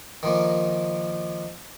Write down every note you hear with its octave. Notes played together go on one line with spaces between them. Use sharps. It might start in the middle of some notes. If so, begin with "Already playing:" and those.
D#3 F3 A#3